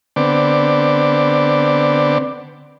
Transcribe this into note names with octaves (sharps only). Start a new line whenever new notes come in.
D3 B3 C4 D5